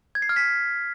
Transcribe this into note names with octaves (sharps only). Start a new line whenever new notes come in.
G#6
C7
F6
B6